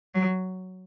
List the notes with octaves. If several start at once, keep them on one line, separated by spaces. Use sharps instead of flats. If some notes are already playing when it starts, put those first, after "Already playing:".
F#3